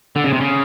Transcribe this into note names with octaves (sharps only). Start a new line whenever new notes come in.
D3
C#3
C3
C#3